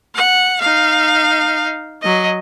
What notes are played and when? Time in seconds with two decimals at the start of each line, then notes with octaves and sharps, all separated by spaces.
0.15 F#5
0.61 D#4 F5
2.02 F#3 D#5